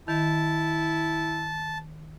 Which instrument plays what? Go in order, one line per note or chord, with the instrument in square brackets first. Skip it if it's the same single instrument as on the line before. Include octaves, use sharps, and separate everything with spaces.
[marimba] D#3 [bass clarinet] E4 [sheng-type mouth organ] A5